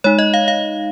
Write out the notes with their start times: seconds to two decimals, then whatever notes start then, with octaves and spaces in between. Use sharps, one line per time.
0.04 G#3 D#4 C#5
0.19 D#5
0.34 F5
0.48 F5